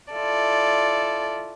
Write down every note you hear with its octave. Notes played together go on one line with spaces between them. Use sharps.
E4 F4 A4 D5